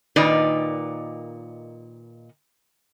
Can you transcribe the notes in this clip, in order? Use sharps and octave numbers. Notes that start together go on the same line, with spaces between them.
A#2 D#3 D#4 B4 D5